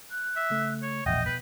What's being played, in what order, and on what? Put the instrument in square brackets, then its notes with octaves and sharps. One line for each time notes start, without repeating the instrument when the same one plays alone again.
[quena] F#6
[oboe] E5
[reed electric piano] C#3 A3
[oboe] C#5
[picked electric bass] E1 A#1 [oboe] D#5 [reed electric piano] E5 F#5 G5 [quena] G6
[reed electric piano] B2 [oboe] B4